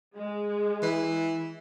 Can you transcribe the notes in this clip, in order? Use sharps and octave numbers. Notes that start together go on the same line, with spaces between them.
G#3
E3